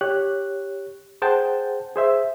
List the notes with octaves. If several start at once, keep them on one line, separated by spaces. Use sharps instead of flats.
G4 C#5 F#6
G#4 C5 F#5 G5 A5 G6
G#4 C5 E5